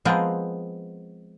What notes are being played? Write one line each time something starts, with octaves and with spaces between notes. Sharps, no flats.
F3 G#3 B3 C4 A#4 A#5